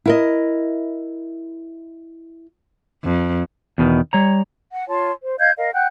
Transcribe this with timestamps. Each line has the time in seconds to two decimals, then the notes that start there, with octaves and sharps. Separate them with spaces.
0.06 E4 A#4 D#5
3.04 F2
3.78 E2 B2 D#3
4.13 G3 C#5 A#5
4.71 F#5
4.89 F4 C#5 A5 C6
5.24 C5
5.40 D#5 F5 G6 G#6
5.58 A#4 D#5 F5
5.74 F#5 G5 F#6 G6